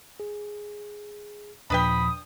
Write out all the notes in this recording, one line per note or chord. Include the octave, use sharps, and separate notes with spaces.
G#4
D#2 A#2 F3 D4 B4 G5 B5 D#6